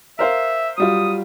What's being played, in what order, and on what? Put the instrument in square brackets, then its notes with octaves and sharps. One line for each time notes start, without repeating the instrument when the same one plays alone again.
[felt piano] A#4 C5 F5 [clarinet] E5
[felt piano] F#3 G3 F4 [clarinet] D#6